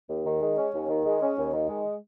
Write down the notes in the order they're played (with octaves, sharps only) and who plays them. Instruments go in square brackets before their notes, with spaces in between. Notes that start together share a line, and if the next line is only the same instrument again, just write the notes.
[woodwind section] D#2
D#3
G#3
C#4
D#2
D#3
G#3
C#4
D#2
D#3
G#3